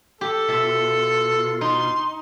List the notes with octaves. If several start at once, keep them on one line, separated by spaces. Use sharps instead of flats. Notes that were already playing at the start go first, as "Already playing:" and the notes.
G4 A4
B2 F4 E5 A5
D#4 C6